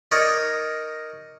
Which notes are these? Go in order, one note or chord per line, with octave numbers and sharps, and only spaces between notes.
D#4 A#4 C#5 D5